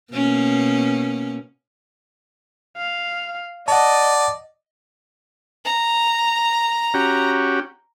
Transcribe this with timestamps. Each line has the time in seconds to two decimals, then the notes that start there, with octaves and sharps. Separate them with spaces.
0.13 B2 A#3 C#4
2.77 F5
3.68 D5 D#5 F#5 A5
5.65 A#5
6.94 C#4 F#4 G4